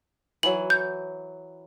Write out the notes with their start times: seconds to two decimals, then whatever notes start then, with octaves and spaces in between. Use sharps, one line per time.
0.43 E3 F#3 F#7
0.70 G6